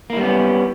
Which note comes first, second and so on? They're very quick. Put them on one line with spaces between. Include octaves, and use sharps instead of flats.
A#3 E4 G3 B3 C#4